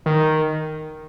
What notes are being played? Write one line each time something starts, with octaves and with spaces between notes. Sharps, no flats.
D#3